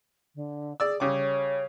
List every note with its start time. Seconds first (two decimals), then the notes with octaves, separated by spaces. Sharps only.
0.35 D3
0.80 G#4 D5 E6
1.00 C#3 G3 C#5 D6